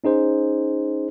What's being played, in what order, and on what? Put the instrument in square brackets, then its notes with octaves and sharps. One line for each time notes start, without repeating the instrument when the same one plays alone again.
[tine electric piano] C#4 D#4 G#4 C5